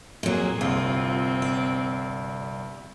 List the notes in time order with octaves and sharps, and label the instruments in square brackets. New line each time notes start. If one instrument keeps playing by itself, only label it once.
[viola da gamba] F2 A#3 G#4 [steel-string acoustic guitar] A#2 F#3
[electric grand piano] G1 C2 [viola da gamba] C4 [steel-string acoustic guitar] F4
[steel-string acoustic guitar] D5